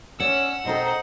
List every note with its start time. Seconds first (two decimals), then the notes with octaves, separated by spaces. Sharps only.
0.20 C#4 C#5 D5 F#5 E6
0.65 B2 C4 D#4 A4 C5 A#5